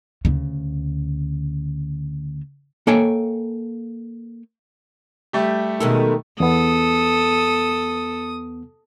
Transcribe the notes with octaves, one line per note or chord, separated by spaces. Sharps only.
D2 C#3
A#3 A4 C#5 G5 G#5
G3 A3 G4
B2 D#3 G#3 A4
E2 B3 A4 D#6